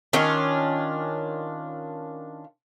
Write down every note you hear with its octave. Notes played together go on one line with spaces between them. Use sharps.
D#3 C#4 D4 F4